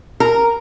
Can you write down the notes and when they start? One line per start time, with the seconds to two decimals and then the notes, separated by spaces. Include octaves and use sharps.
0.20 A#4